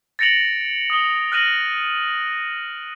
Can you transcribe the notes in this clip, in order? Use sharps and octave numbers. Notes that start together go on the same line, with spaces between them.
A6 A#6 C#7 D7 F7 F#7
D#6 G7
F6 F#6 A#6 D#7 F#7